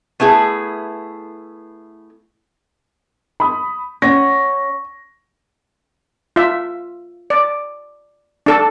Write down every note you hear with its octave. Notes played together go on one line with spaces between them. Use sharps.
A3 B3 E4 G#4
B5 D#6
C#4 F#5 C#6 A#6
F4 E5
D5
D4 A4 A5